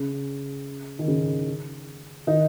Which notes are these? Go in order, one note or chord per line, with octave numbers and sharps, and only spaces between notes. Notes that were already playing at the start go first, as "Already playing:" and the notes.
Already playing: C#3
D#3
C#3
D#3 D#4